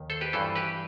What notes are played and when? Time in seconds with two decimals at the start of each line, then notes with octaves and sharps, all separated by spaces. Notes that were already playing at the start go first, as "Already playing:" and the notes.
Already playing: D#2 D#3
0.10 A4 C5
0.21 G4 B4
0.33 G2 E3 A4 C5
0.56 G4 B4